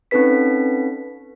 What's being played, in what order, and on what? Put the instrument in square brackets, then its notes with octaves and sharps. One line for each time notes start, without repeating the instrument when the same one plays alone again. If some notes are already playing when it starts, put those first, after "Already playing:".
[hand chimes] C4 C#4 D#4 A4 B4 B6